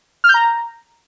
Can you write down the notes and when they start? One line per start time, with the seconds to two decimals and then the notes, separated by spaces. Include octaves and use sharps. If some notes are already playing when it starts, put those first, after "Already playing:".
0.24 F6
0.29 G6
0.34 A#5